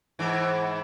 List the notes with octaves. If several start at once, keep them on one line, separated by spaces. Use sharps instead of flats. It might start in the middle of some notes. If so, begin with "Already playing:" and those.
G#2 E3